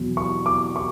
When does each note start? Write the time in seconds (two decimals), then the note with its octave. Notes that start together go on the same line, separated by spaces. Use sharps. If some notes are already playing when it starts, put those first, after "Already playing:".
Already playing: E2 B2 F#3
0.17 C#6
0.46 D6
0.76 C#6